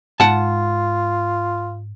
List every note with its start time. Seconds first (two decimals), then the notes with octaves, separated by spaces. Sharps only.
0.20 G#2 F4 F#5 A5